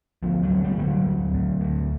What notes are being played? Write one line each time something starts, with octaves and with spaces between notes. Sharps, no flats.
D2 F3
F#3
D2
G3
D3 G3
F#3
D2
D2
D2